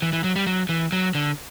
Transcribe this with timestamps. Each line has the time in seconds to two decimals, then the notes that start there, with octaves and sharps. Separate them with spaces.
0.02 E3
0.13 E3
0.24 F#3
0.36 G3
0.47 F#3
0.69 E3
0.92 F#3
1.15 D3